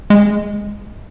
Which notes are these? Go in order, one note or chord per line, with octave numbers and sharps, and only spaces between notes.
G#3